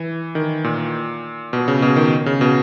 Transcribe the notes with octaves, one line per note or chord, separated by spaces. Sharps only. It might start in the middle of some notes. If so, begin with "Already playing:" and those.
Already playing: E3
D#3
A#2
B2
C#3
B2
D#3
C#3
B2